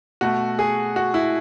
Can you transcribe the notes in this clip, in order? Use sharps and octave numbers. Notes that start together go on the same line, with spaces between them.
B2 A3 F#4
G#4
F#4
E4